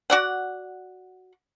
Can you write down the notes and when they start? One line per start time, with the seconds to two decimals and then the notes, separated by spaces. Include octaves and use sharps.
0.10 F#4 D5 F#5